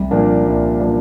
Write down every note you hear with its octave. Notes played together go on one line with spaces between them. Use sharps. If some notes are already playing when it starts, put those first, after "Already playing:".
Already playing: C2 G3
A#2 F3 A#3 D4
C2
A#2 F3 A#3 D4